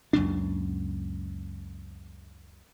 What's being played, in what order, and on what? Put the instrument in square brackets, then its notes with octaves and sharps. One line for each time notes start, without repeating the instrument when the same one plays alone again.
[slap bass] C#2 F#2 A#2 D4